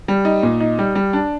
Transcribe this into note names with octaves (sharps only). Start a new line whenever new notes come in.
G3
D#4
A#2
D#4
G3
G3
D4